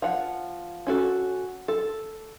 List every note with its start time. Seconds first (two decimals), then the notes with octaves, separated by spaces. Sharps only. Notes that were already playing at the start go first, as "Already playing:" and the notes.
0.02 F3 F#5
0.87 C#4 F#4 A4
1.68 A4